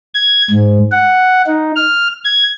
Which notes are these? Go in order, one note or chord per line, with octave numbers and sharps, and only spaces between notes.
G#6
G#2
F#5
D#4
F6
G#6